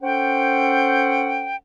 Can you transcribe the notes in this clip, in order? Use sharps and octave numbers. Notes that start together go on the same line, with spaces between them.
C#4 A4 C5 F#5 G5